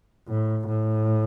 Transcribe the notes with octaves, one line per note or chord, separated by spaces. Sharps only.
A2
A2